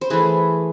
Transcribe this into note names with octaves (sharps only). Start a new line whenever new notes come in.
C5
E3 A3 G#4 B4